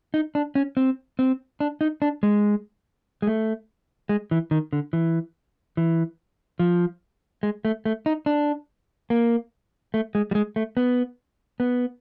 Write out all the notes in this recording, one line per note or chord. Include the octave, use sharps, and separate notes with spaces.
D#4
D4
C#4
C4
C4
D4
D#4
D4
G#3
G#3
A3
G#3
E3
D#3
D3
E3
E3
F3
G#3
A3
A3
D#4
D4
A#3
A3
G#3
G3
G#3
A3
B3
B3